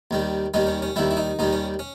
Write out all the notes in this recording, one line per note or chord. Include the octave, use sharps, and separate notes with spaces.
D#2 D#3 G3
D#2 D#3 G3 D#4
C#4
C#4
D#2 D#3 G3 E4
E4
D#4
D#2 D#3 G3 D#4
C#4
C#4